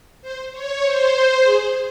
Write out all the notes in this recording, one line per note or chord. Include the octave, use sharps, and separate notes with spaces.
C5
C#5
C5
G#4